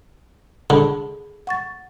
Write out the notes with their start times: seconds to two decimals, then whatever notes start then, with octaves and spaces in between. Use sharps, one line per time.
0.70 D3 G#4 A5 B5
1.47 F#5 C#6 A6